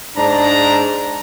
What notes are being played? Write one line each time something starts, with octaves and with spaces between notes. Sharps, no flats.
G#2 D4 A#5